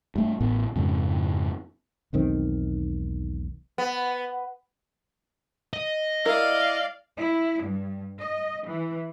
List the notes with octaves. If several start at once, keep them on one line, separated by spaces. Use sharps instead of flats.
G2 A3
A1 A2 B3
F2 G#2 C#3
E1 B1 D#3 C4
B3
D#5
E4 A#4 D5 F5
E4
G2
D#5
E3